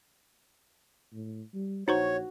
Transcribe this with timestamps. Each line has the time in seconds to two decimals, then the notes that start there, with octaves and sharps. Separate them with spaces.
1.13 A2
1.54 G3
1.88 A#1 D#4 F#4 C5 C#5 C#6